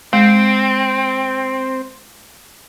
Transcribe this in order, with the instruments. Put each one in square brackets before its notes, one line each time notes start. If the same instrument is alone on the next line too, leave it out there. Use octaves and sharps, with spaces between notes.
[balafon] G#3 [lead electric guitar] C4